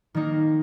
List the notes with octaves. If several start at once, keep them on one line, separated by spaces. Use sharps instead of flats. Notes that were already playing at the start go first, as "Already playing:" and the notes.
D#3 A#3 D#4